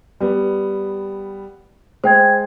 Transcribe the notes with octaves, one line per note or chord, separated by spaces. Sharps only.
G3 B3
G#3 C5 G5 G#6